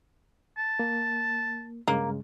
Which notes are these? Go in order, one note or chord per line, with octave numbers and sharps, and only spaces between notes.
A5
A#3
G2 C#3 G#3 A#3